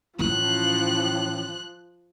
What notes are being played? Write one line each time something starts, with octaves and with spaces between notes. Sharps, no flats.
A2 E3 F3 C#4 F#6